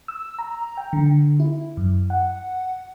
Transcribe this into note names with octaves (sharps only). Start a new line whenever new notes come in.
E6
A#5
G5
D3
E4
F#2
F#5